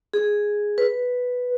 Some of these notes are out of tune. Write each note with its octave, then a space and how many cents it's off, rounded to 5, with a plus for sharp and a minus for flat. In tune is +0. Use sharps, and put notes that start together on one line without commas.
G#4 +0
B4 +0